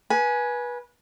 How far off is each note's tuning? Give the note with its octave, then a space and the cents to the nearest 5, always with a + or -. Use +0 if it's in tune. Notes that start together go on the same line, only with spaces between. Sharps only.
B4 -25 G#5 +10